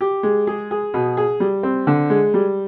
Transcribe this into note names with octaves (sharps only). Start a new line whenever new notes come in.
G4
G#3
G#4
G#4
B2
G#4
G3
C4
D3
G#3
G3